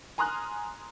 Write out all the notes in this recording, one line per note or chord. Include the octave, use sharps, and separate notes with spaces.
G#5 A#5 C6 D#6 F6 F#6